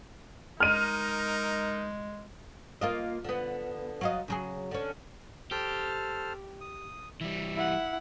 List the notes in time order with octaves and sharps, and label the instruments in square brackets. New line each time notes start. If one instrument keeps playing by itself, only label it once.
[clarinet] G#3 [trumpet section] D#4 A#4 [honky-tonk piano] F6 D#7
[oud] A#3 F4 D#5
D3 B3
F#3 F4 D#5
C#3 F#3 G#4
D3 C#4
[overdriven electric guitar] G4 [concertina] A4 C5 F6
[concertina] D#6
[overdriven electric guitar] E3 G3 [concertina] E5
[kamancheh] E4 F#5